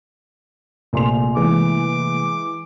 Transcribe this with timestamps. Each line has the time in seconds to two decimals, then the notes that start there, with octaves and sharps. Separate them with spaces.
0.93 A#1 C3 A3 A#3 C6 F7
1.37 E3 G#3 D6